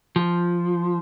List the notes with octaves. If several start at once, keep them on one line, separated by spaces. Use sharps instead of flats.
F3